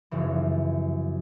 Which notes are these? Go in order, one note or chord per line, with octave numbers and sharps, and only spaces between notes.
F1 F#2 C#3 E3